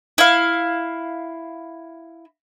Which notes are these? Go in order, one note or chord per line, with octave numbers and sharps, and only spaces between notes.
E4 F5